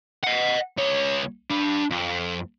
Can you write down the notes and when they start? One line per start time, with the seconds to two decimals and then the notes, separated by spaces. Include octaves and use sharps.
0.24 D#5 F#5
0.77 C#2 C#5
1.50 D4 B5
1.90 F2